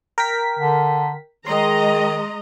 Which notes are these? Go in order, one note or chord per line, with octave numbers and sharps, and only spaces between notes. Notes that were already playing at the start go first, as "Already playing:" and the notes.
A#4 G5 B6
D3
D#3 G#3 D#5 A#5 C6